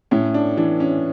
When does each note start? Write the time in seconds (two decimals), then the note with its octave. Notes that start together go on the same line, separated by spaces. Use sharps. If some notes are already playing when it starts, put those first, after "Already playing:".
0.11 A2 C#4
0.34 D4
0.57 E3 D4
0.80 C#4